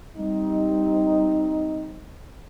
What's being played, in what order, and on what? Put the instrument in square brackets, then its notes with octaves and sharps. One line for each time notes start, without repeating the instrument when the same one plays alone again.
[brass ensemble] G3 C4 D#4